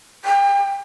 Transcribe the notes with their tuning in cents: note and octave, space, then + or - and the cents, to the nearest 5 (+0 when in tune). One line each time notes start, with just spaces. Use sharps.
G5 +30